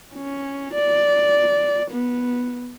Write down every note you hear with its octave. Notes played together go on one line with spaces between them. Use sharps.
C#4
D5
B3